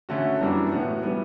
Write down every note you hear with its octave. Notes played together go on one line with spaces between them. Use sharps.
D3 A3 C#4 F#4
F#2 E3 G3 D4
A2 E3 B3 F#4
E3 G3 B3